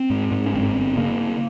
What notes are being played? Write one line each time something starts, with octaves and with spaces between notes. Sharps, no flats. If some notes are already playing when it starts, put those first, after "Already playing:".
Already playing: C4
G#2
G#2
C#4
G1 C4
G1
C#3 A#3